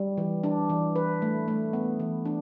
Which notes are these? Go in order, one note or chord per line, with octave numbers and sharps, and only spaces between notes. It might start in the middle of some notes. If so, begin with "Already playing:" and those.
Already playing: G3
E3
D4
E3
B4
A3
A3
B3
E3
D4